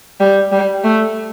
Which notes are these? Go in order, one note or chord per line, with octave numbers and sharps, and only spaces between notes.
G3
G3
A3